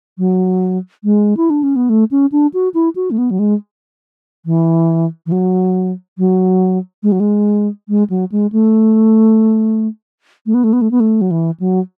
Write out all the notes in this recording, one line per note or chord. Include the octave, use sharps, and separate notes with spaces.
F#3
G#3
E4
D4
C#4
B3
A3
C#4
D4
F#4
E4
F#4
A3
B3
F#3
G#3
E3
E3
F#3
F#3
G#3
F#3
G#3
G#3
F#3
G#3
A3
A3
B3
A3
B3
A3
B3
A3
F#3
E3
F#3